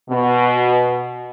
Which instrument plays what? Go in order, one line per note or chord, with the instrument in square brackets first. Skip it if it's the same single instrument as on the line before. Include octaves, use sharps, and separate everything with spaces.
[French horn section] B2